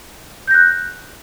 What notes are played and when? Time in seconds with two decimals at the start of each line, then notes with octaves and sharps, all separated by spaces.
0.47 G6
0.51 A#6
0.54 F#6